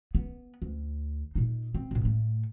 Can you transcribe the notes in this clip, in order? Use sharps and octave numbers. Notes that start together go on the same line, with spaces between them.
B3
D2
A#2 D#4
C4
F#2 A#2
A2 A3